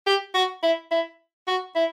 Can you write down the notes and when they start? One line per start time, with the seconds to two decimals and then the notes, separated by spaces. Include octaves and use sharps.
0.06 G4
0.34 F#4
0.63 E4
0.91 E4
1.47 F#4
1.75 E4